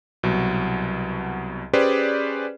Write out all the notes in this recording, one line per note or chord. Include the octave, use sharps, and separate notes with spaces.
C2 B2 F#3
C#4 G4 G#4 B4 C5 D5